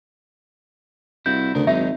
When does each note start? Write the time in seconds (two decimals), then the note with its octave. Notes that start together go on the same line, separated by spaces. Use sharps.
1.26 C2 E4 F#4 G6
1.55 D2 C#3 A#4
1.67 G#1 D#2 F#3 D#4 E5